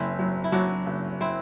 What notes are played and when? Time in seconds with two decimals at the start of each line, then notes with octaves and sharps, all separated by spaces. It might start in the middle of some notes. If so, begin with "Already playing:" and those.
Already playing: F#1 C4 E4
0.19 F#3
0.44 E4
0.52 F#3 D4 F#4
0.86 F#1
1.21 C4 E4